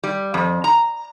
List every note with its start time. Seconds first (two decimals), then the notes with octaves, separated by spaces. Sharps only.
0.04 G3
0.34 F2
0.64 A#5